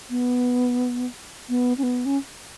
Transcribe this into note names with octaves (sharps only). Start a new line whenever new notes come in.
B3
B3
C#4
B3
C#4